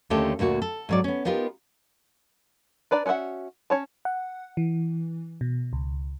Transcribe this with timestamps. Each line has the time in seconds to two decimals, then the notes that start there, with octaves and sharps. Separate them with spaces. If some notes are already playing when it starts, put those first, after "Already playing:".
0.10 D#2 D3 A3 C#4 G4 A4
0.39 D2 A#2 A#3 F#4
0.62 A4
0.89 G#2 F#3 D5
1.04 B3 C#4
1.25 B3 D#4 F4 G4 A#4
2.91 D4 B4 D5 A#5
3.06 C#4 F#4 D#5 E5 F#5
3.70 C#4 C#5 A5
4.05 F#5
4.57 E3
5.41 B2
5.73 C#2